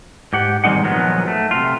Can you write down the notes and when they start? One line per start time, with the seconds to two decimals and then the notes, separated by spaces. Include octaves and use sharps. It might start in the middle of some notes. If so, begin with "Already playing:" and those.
0.33 G#2 G4 F#5
0.64 C3 D#3 G3 G#3 D#4 F#5
0.83 A#2 D#3 F3 F#3 G#3 B3
1.28 A3
1.51 C3 F4